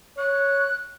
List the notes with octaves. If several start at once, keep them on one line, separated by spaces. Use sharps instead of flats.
C#5 F#6